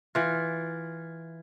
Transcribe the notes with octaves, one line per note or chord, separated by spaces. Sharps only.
E3 F4